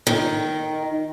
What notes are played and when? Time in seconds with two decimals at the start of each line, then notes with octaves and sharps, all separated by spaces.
0.07 D#3